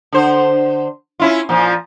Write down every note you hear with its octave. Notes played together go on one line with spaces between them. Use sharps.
D3 C5
C#4 E4 F4
A#2 F3